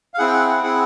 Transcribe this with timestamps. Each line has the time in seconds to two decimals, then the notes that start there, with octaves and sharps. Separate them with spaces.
0.14 F5
0.18 C4 E4 G#4 F#5
0.27 G5
0.33 F#5
0.48 F#5
0.63 C4 E4 G#4 F#5